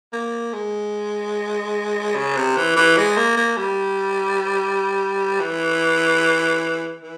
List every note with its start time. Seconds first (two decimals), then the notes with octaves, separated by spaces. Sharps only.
0.13 A#3
0.53 G#3
2.16 C#3
2.36 C3
2.57 E3
2.76 E3
2.97 G#3
3.17 A#3
3.37 A#3
3.58 G3
5.40 E3
7.02 E3